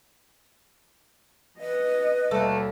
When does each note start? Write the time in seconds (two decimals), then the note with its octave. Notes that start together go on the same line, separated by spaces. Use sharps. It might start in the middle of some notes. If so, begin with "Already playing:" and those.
1.60 B4 D#5
2.31 D#2 B2 G3 A3